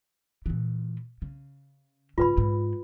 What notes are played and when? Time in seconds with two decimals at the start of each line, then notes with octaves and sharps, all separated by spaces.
0.46 A#2 E3
1.22 C#3
2.18 G#2 C#3 F4 B4 B5
2.38 G#2